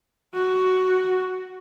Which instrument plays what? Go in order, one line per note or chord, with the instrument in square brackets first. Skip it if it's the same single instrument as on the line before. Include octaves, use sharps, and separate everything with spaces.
[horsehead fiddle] F#4